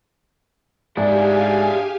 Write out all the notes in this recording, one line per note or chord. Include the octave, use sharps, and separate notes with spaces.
G#2 D4 E4 G4 G#4 D5 F5 G#5